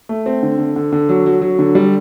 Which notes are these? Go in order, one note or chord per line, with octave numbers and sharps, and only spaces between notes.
A3
C4
D3
D3
D3
D3
F#3
F#3
F#3
D3
G3